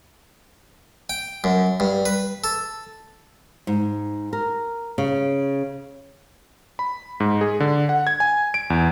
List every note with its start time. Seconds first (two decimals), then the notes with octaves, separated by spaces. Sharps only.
1.10 G5
1.44 F#2
1.80 G2
2.05 B4
2.44 A4
3.67 G#2
4.33 A#4
4.98 C#3
6.79 B5
7.20 G#2
7.41 G#4
7.60 D3
7.89 F#5
8.07 G#6
8.20 G#5
8.54 D7
8.70 E2